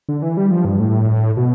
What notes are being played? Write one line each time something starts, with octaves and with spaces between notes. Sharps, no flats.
D3
E3
G3
F3
G2
A2
B2